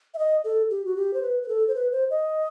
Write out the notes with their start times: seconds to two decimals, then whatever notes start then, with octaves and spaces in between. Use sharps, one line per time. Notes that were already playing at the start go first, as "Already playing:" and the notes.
0.14 E5
0.18 D#5
0.44 A4
0.70 G4
0.85 F#4
0.96 G4
1.14 C5
1.22 B4
1.43 B4
1.49 A4
1.68 C5
1.75 B4
1.92 C5
2.10 D#5